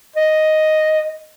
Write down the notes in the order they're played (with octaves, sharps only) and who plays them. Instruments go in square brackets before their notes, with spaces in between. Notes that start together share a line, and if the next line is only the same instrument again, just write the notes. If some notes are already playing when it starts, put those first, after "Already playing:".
[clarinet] D#5